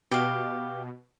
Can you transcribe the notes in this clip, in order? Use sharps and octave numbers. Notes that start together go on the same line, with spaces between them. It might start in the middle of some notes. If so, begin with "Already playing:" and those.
B2 G4 F5